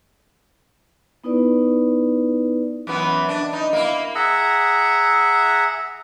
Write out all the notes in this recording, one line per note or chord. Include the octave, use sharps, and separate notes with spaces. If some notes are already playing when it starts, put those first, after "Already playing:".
B3 D#4 E4 B4 D5
F#2 E3 B3
D4
D#4
A#3 E4
G#4 E5 F#5 A#5